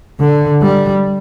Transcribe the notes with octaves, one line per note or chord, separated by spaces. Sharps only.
D3
G3